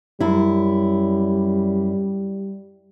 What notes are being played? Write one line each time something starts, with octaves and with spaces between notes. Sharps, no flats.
F#2 G3 E4